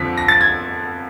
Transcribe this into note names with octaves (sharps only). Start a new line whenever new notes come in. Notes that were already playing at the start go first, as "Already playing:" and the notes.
Already playing: F2 D3 F3 B6
A#6
A6
G#6